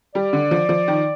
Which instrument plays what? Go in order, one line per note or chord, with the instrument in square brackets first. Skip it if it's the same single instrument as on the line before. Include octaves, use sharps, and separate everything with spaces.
[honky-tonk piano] G3 [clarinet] D5
[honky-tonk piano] D3
F3
F3
D#3